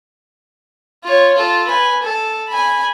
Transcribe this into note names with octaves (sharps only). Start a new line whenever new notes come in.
F4 C#5
F4 A4
B4 G#5
A4
G#5 B5